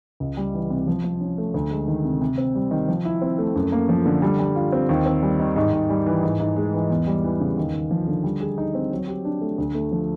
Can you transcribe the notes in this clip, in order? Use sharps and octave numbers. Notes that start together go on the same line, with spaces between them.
C#2
G3
E3
C3
F3
F3
C#4
A3
D2
G#3
D#3
C3
C3
C4
G3
D#3
F3
E4
C4
A3
F#2
A#3
F3
D3
G3
G3
F4
C4
D#2
C4
G3
D#3
G#2
G#2
G3
E3
G#2
G#2
G#3
E3
E2
G3
E3
C#3
D#2
D#2
F3
D3
G3
G#4
D#4
C4
F#3
G4
D4
A3
D2
A3
F3